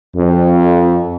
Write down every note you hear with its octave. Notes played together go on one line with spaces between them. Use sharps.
F2